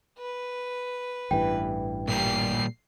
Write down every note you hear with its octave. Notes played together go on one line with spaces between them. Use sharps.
B4
A1 G2 E3 G5
A#2 G3 G4 C7